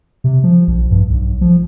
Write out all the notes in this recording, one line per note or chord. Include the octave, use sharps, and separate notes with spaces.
C3
F3
A#1
G2
B1
F3